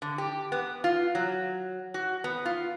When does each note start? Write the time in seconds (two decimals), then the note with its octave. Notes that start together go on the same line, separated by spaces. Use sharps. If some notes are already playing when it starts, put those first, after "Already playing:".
0.02 D3
0.18 G4
0.52 B3
0.84 F4
1.15 F#3
1.94 F#4
2.24 B3
2.45 F4